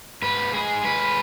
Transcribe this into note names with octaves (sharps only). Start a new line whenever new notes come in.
G#2 B4
G#3 G#4
G#3 B4